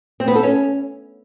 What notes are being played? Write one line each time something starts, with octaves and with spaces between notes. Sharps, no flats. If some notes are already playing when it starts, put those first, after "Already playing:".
C4
B3
A4
C#4